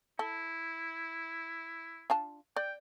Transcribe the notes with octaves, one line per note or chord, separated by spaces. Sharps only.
E4 A4
D4 F4 A5
D5 G5